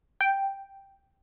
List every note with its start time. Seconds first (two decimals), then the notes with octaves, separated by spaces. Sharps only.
0.21 G5